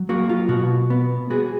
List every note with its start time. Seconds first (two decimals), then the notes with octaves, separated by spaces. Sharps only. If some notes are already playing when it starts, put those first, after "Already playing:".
Already playing: F#3
0.09 A#3 F#4
0.29 F4
0.49 B2 F#4
0.90 B3
1.30 B3 F#4 G#4